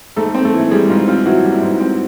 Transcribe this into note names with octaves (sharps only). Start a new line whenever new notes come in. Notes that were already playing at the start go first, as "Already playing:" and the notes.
G#2 A3 A4
C4
A3 A4
E3
G3 G#3 G#4
G#2 F4
C4 F4
E3 F#3 F#4
G3
E4
G#2
C4